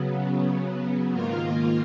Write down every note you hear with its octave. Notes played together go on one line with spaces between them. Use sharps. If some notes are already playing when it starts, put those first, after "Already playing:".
Already playing: C#3 F#3 B3
G#2 D#3 A#3 F4 A#4